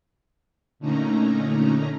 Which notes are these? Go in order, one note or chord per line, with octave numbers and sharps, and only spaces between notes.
A#2 D3 A3 C#4 D#4 A#5